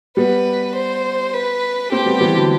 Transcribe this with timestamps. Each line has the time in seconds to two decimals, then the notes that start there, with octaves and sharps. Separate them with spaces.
0.17 G3 B3 B4
0.76 C5
1.34 B4
1.92 A3 C4 G4
2.06 G3 B3
2.20 E3 G3
2.35 D3 F#3